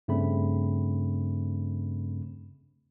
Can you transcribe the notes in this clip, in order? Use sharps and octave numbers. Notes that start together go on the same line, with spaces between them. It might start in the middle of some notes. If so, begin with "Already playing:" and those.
G2 C#3 A3 C4 D4 B5